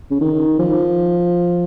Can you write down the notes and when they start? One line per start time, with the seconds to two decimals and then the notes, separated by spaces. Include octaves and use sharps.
0.10 C#3
0.21 D#3
0.59 F3